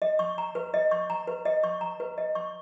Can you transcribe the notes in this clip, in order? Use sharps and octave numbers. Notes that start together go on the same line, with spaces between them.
D#5
C#6
A#5
B4
D#5
C#6
A#5
B4
D#5
C#6
A#5
B4
D#5
C#6